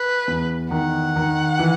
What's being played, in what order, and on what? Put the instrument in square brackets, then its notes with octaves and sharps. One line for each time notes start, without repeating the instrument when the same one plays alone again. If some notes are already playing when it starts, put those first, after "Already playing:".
Already playing: [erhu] B4
[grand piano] E2
[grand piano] D#3 [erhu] F#5
[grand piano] D#3
E3